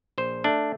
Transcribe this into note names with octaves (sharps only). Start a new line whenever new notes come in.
A#1 C5
A3 D4